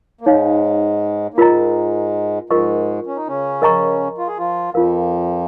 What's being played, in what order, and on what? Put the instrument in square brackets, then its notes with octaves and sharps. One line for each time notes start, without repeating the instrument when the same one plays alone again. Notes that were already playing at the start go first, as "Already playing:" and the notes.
[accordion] A#3
[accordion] G#2 G#3 [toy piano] D#4 C#5 F5
[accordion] A#3
[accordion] G#2 G#3 [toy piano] F4 A#4 D#5 A#5
[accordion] G#2 G#3 [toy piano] F4 A#4 D#5 C#6
[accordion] C#4
D#4
C#3 C#4
[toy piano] A#4 D#5 A#5 C#6
[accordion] F4
G#4
F3 F4
[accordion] F2 F3 [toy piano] F4 A#4 F5